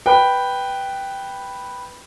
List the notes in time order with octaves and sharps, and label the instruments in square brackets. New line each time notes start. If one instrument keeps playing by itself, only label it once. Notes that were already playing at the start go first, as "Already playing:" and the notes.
[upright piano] B4 G5